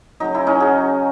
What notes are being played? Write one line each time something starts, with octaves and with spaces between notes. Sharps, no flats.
C#3 F#3 D#4
E4
C#4 D#4
F#4 G#4